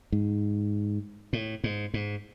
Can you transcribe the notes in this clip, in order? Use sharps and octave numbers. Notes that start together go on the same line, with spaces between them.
G#2
A2
G#2
G#2